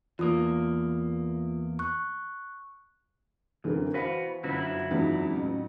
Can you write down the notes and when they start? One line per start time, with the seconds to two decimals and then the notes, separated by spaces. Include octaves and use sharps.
0.19 E2 A#3 F4 D#6
1.79 C#6 F#6
3.64 F#2 D3 E3 C4 A#4
3.94 F#4 B4 C5 F5 B5
4.43 G1 F#2 E4 F#4
4.90 G#1 E2 C#3 F#3 D#4 F4
5.36 A1